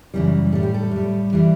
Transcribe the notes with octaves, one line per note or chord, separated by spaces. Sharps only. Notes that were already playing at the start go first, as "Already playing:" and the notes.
F#2 C#3 E3 G3
A2 G3 A4
G4
A4
A2 G3
E3 G3